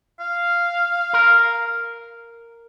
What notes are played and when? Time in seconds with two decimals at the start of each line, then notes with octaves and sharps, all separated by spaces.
0.20 F5
1.13 A#4